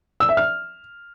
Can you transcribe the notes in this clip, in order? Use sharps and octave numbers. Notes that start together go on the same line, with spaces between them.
E6
E5
F6